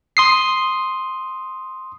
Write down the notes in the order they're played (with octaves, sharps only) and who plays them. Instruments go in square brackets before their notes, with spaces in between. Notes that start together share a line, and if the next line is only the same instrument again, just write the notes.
[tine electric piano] C6 D#6 C7